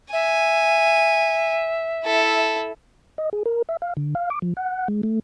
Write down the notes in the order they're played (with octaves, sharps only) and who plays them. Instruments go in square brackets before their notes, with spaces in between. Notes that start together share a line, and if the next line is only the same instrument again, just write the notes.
[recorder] E5 [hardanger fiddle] G#5
[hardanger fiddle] E4 A4
[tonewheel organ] D#5
G#4
A#4
E5
F5
D3
F5
D6
F3
F#5
G#3
A3